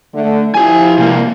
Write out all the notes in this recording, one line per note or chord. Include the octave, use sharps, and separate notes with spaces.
D3 A3
F3 E4 G4 G#5
C3 A#3